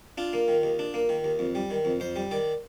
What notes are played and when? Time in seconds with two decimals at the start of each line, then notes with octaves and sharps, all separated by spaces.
0.18 D4 F4
0.33 A#3
0.48 D#3
0.63 D#2
0.79 D4
0.94 A#3
1.09 D#3
1.24 D#2
1.39 F2
1.55 G3
1.70 D#3
1.85 F2
2.00 F2 C5
2.16 G3
2.31 D#3 D5